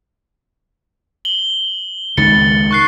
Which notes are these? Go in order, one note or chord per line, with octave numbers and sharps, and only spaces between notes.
F#7 G7
C#2 D#3 A6 C#7
C#6 F#6 C7